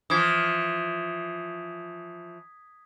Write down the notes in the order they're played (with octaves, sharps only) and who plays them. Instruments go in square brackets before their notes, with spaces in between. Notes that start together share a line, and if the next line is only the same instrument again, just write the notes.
[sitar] E3 F3 [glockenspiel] D#6 G#6 B6